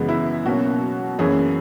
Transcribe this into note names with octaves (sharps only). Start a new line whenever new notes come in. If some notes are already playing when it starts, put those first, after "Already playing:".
Already playing: F#2 C#3 E3 G#3 B3
E4
B2 F#3 A#3 C#4 F#4
F#2 E3 A#3 C#4 G#4